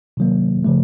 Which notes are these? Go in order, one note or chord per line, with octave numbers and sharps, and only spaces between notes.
C3 D#3 F#3 A#3
C#3 F3 A3